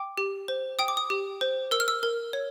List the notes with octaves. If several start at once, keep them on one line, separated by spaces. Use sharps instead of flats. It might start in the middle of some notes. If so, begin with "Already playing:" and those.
Already playing: G5 D6
G4
C5
G5 D#6
D6
D#6
G4
C5
A#4 E6
F6
E6
A#4
C#5